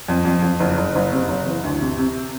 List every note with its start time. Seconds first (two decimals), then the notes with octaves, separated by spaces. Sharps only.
0.08 F2
0.25 F2
0.42 F2
0.60 F#1
0.77 F#1
0.95 F#1
1.12 C3
1.29 F#1
1.46 E3
1.64 D2
1.81 C3
1.98 C3